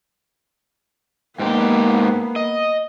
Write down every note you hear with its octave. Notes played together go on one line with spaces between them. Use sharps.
G#2 A#3 B3 G4
D#5